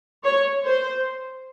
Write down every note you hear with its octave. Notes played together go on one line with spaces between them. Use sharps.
C#5
C5